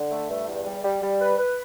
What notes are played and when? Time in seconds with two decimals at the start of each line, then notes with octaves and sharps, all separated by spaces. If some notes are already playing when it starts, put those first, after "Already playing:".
Already playing: D3
0.11 A3
0.30 G2
0.48 E2
0.66 G3
0.84 G3
1.02 G3
1.20 B4
1.38 B4